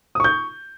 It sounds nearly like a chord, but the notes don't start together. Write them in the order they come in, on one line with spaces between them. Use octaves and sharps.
D#6 C#6 G6